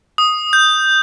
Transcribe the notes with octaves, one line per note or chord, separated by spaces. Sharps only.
D#6
G6